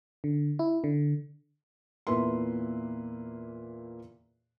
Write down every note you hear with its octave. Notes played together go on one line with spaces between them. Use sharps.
D3
E4
D3
E2 A#2 A#3 B4 E5 C6